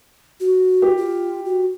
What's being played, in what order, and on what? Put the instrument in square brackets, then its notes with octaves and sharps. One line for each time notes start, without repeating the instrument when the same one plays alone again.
[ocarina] F#4
[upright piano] G4
[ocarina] F4
F#4